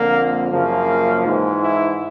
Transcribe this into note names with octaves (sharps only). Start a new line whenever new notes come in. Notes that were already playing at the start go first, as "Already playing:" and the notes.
Already playing: F2 D3 F3 A#3
F#2 C#3 F3 A#3
G#2 E3
E4